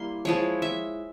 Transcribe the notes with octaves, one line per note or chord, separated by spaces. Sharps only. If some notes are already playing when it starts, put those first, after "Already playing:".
Already playing: G3 A#3 E4 C6
F3 G#3 E4 C#5
E5